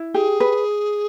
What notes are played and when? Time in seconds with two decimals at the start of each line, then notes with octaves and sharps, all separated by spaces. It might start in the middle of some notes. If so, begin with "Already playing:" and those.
Already playing: E4
0.14 G4 G#4
0.40 B4